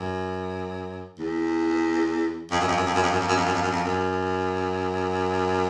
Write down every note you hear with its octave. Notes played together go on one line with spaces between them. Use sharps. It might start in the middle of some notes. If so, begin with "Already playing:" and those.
Already playing: F#2
E2
F2
F#2
F2
F#2
F2
F#2
F2
F#2
F2
F#2
F2
F#2
F2
F#2
F2
F#2